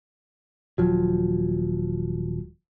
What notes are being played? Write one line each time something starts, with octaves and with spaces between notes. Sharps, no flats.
D#1 F3 F#3